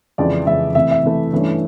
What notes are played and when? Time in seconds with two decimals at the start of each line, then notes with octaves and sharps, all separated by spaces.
0.18 F2 C#3 E3 G#3 D5
0.46 F2 C#3 E3 G#3 E5
0.75 C3 E3 A3 E5
0.91 E5
1.03 C3 E3 A3
1.32 G2 E3 A3 C#4